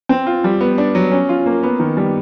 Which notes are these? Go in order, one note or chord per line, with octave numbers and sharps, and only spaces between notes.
C4
F4
G3
B3
D4
F#3
C#4
F4
A#3
B3
D#3
G3